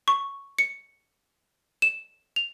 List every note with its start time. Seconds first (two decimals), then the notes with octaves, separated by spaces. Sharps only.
0.08 C#6
0.59 C#7
1.82 E7
2.36 F7